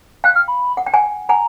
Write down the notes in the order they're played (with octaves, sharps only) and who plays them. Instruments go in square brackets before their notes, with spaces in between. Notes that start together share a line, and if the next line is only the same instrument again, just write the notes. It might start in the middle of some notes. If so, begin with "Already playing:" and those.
[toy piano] F5 G5 [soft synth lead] F#6
[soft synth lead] F6
B5
[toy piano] F#5
G5
F#5 G#5
[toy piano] F#5 G#5 [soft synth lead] A#5